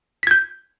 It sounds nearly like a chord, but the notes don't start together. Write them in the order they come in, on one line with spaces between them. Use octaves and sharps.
B6 G#6 G6